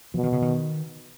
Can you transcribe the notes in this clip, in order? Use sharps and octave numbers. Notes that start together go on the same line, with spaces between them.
B2 F3
D#3
C#3
D#3